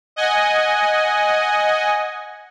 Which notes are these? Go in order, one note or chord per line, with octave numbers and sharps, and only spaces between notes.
D#5 F#5 G#5